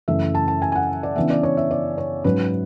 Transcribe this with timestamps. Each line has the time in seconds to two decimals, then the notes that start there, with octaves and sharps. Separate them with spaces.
0.08 F#2 C#3 E3 A3 E5
0.35 A5
0.48 A5
0.62 G#5
0.72 G#5
0.75 F#5
1.03 D5
1.16 C#3 E3 B3 D4 E5
1.30 D5
1.43 C#5
1.57 E5
1.71 D5
1.98 C#5
2.24 G#2 F#3 C#4 B4